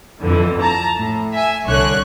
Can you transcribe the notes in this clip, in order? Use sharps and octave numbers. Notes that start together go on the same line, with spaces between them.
F2 D3 E3
A5 A#5
A2
E5 G#5
C2 D3 C#5 C#6 F#6